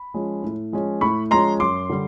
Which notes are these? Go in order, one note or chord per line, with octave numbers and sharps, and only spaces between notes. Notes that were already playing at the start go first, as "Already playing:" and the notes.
Already playing: B5
F3 G#3 C#4
A2
F3 G#3 C#4
A2 B5 C#6
F3 G#3 C#4 A#5 C6
F#2 C6 D6
D3 G3